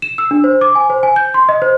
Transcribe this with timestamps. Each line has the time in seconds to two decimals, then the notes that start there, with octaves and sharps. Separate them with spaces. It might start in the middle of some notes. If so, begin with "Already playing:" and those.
0.02 E7
0.18 E6
0.31 D4
0.44 C5
0.61 D6
0.75 G#5
0.90 C5
1.03 G#5
1.16 G6
1.34 C6
1.49 D#5
1.62 C5